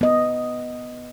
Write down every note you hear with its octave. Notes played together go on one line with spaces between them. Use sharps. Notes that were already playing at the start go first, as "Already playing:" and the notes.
B3 D#5